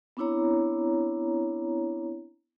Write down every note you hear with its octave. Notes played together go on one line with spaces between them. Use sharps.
B3 C4 D4 E4 C#5 A#5